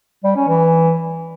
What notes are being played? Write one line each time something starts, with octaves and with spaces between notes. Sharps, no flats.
G3
C#4
E3